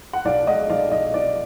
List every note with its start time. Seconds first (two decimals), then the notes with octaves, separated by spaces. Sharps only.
0.13 F#5
0.25 B1 D5 F5
0.47 G#3 D#5 F#5
0.69 B1 D5 F5
0.92 B1 D#5
1.14 B1 D5